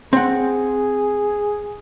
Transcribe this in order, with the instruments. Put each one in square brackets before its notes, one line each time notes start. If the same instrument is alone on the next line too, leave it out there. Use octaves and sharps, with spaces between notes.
[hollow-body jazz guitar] C4 F#5 [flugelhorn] G#4